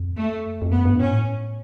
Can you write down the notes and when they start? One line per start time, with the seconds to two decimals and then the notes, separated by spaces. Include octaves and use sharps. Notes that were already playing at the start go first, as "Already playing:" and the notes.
Already playing: F2
0.15 A3
0.62 F2
0.71 F#2 B3
0.85 G2
0.99 A2 C#4